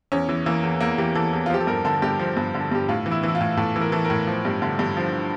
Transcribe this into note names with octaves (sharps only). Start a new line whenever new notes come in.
E2 C#4
E3
E3 A#3
E2
E2 A#3
E3 G4
E3 A4
E2
F4
F3 G4
A4
G2 A#4
D3 A4
A4
G2 G4
F3
G2
D3
A4
G2 G4
A2 F4
E3
E4
E3 E4
F4
A2
A2 A4
E3
A#4
E3 A4
A#4
A2
F3
G2
D3
G2
F3